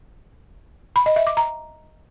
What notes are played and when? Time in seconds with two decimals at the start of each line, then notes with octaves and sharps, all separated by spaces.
0.96 B5
1.06 D#5
1.16 E5
1.27 D6
1.37 A#5